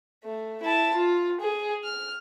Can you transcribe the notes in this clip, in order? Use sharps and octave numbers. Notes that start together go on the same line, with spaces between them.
A3
E4 A5
F4
G#4
F6